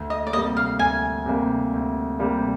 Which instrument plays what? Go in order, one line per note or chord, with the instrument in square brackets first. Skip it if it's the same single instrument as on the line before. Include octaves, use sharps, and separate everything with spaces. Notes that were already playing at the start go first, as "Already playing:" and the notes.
Already playing: [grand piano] D2
[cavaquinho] D#5
D5
[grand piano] C3 G3 A#3 [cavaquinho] D#5
[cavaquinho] F5
[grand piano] D2 [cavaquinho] G#5
[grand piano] C3 G3 A#3
D2
C3 G3 A#3